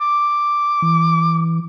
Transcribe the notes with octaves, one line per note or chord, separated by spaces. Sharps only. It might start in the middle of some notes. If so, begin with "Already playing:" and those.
D6
E3